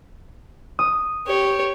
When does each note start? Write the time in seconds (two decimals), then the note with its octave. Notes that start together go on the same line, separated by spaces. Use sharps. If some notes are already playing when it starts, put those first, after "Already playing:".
0.79 D#6
1.27 G4 C#5